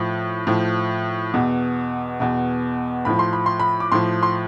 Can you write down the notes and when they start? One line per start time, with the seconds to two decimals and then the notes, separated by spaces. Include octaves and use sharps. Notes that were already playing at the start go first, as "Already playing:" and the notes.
Already playing: A2 F3
0.47 A2 F3
1.34 E2 B2
2.20 E2 B2
3.05 A2 F3 B5
3.19 C6
3.33 B5
3.46 C6
3.60 B5
3.80 D6
3.92 A2 F3 C6
4.23 C6